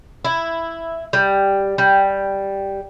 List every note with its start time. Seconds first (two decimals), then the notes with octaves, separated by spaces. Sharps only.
0.25 E4
1.13 G3
1.78 G3